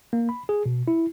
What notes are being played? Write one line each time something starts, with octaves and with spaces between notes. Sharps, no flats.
A#3
B5
G#4
B2
E4